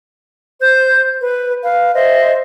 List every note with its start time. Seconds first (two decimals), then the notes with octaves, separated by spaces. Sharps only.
0.61 C5 G6
1.21 B4
1.62 B4 F5
1.94 C5 D#5 E5